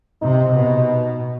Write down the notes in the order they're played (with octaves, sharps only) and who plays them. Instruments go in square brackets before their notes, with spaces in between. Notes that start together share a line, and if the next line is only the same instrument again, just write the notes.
[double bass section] C3 [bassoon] D#4
[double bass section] B2